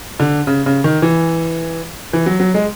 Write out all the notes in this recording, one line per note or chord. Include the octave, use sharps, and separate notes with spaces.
D3
C#3
C#3
D#3
E3
E3
F#3
F#3
G#3